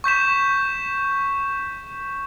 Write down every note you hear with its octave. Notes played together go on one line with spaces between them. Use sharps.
C#6 G6 B6 E7